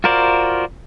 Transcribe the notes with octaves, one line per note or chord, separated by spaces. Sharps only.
F4 F#4 A#4 C5 D5